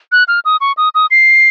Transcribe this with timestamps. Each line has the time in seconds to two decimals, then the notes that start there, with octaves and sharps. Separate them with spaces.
0.12 F#6
0.28 F6
0.45 D#6
0.61 C#6
0.77 D#6
0.95 D#6
1.11 C7